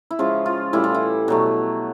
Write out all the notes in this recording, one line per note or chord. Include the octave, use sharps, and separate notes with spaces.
E4
C#3 F3 G#3 F4
F4
A2 E3 G3 E4
F4
E4
B2 F#3 A3